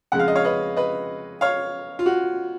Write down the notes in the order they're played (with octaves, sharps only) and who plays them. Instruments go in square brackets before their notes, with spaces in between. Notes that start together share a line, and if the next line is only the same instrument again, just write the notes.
[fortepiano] F2 C#3 G#3 F#5
F5
D#5
C#5 F5
B4 D#5
B4 D#5
C#5 F5
F4
F#4